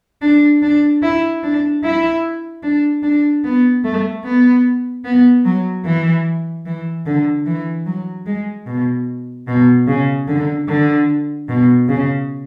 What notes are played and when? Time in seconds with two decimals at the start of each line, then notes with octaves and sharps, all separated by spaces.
0.22 D4
0.63 D4
1.02 E4
1.43 D4
1.83 E4
2.63 D4
3.03 D4
3.44 B3
3.84 A3
4.25 B3
5.05 B3
5.45 F#3
5.85 E3
6.66 E3
7.06 D3
7.46 E3
7.86 F#3
8.26 G#3
8.67 B2
9.48 B2
9.88 C#3
10.28 D3
10.68 D3
11.49 B2
11.89 C#3